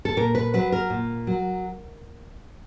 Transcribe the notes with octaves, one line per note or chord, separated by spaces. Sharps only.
A4
A#2 A#4
B4
F#3 B4
A#4
A#2
F#3